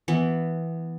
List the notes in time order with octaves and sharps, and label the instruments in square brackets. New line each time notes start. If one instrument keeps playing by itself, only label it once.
[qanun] E3 B3